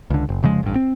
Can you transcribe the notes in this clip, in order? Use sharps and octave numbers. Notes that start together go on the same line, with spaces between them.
C#2 D3
F#1
F1 C#3 F3 G#3
A1 G2
C4